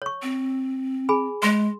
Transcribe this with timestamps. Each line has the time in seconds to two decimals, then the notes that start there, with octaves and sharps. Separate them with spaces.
0.02 C#5 C#6
0.22 C4
1.09 G#4 G#5 B5
1.43 G#3 C6